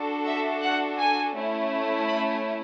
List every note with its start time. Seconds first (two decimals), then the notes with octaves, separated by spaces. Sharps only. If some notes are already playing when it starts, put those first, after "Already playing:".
Already playing: D4 F#4 A4
0.26 E5
0.62 F#5
0.98 G#5
1.35 A3 C#4 E4
2.07 B5